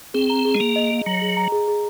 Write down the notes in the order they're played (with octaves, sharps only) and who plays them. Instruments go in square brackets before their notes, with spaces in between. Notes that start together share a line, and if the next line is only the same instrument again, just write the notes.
[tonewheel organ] C4 [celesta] G#4
[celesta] A#5
G#4
[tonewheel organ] G#3
[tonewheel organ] A#3 [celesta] G#4
[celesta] D#5
G#4
[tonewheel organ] F#3 [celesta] A#5
[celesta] G#4
A#5
G#4
G#4